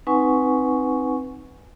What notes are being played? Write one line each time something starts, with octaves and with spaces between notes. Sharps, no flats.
C4 D#4 B4 F#5 G#5 C#6